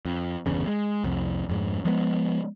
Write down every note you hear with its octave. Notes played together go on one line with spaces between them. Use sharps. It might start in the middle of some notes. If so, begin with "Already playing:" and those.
F2
G1 E2 C#3
G#3
C2 F2
F2 G#2
F3 G#3 A#3 B3